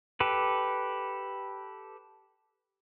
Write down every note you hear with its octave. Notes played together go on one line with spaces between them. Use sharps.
G4 A4 B4